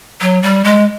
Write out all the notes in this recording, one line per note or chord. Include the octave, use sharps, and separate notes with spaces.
F#3
G3
G#3